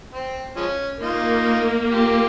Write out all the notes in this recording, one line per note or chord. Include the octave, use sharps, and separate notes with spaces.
C4
F3 G#3 C#4
A#3 D#4 F4
F4 G4